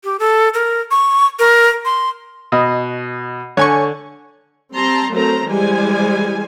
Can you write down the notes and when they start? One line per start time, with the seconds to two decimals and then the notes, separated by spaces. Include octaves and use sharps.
0.04 G4
0.19 A4
0.54 A#4
0.91 C#6
1.39 A#4
1.85 C6
2.52 B2 D#5
3.57 D3 C#5 G#5 C#6
4.73 G3 C4 A5 A#5 C6
5.12 F#3 A3 C4 A#4 C5 A#5
5.47 E3 G3 G#3 G4 C5 G#5